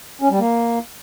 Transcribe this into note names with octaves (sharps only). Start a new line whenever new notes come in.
C#4
G3
A#3